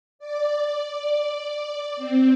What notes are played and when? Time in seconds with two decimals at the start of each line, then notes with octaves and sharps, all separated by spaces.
0.19 D5
1.97 C4